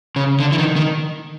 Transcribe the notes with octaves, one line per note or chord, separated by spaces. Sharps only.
C#3
D3
E3
D#3
D#3